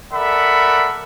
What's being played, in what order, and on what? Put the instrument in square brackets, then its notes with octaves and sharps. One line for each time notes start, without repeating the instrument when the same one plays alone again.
[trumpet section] A4 A#4 D5 E5 F#5 B5